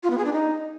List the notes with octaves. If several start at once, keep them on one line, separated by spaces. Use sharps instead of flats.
F4
B3
G#4
D4
D#4